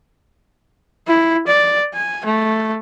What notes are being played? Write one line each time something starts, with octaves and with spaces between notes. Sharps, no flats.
E4
D5
G#5
A3